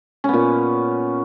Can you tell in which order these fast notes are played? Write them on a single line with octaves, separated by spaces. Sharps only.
C#4 B3 A#2